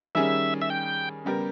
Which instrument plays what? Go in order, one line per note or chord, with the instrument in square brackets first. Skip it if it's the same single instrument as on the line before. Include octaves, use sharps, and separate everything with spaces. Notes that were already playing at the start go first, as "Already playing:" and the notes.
[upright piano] D#3 G3 C#4 G#4 [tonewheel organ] E5
[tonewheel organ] E5
G5
[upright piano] C#3 G3 B3 G4 A#4